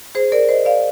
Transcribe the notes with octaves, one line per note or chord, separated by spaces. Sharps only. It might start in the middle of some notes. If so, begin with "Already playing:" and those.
G#4 C5
A#4 D5
C5 D#5
D5 F5